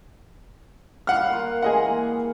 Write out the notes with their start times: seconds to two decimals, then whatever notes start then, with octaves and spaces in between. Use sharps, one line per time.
1.07 G3 F5 F#5 F6
1.30 A#3 F4
1.62 E3 G#3 A#3 G#4 D#5 F#5
1.85 A#3